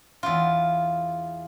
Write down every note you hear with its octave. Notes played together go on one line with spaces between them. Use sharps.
E2 F4